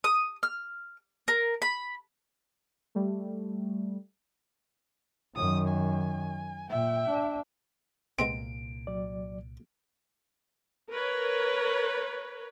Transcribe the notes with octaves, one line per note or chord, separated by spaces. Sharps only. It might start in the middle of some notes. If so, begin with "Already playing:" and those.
D#6
F6
A#4
B5
G3 A3
F#2 D#3 D#6
G#5
A#2 E5 G5
D4
C2 A#2 G#3 B3 C4 D7
F#3 D5
A#4 B4 C#5